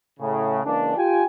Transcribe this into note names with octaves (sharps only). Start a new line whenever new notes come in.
A2 C#3
C#3 E3 G#3 A#3 D4
F4 G4 G5 G#5